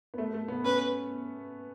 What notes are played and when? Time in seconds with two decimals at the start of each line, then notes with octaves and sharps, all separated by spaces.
0.14 B3
0.18 A3
0.34 A3
0.48 B3
0.64 C#4 B4